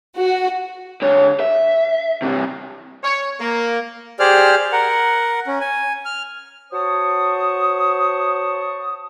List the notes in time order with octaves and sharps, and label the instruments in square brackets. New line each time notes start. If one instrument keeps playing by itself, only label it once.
[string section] F#4
[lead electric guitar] D3 C#5
E5
C3 E3
[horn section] C#5
A#3
[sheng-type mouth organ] G4 G#4 C5 D5 F6
A#4 F#5
C#4
G#5
F6
[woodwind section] F#4 C5 C#5 A5 C#6 D#6